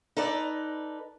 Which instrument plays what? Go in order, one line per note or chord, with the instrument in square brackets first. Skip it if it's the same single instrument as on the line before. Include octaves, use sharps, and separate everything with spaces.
[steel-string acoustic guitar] D#4 A4 B4 D5